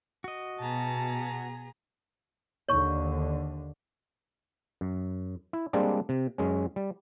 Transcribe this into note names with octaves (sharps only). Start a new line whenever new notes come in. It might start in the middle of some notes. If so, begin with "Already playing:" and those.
F#4 D#5
B2 B3 G#4 A5 A#5
D#2 D3 C#5 C#6
F#2
E4
G3 G#3 A#3 C4 D4
C3
F#2 G#3 C#4
G3